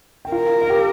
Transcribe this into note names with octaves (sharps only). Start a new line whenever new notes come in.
G5
F4 A#4 F5
F5
G4 G5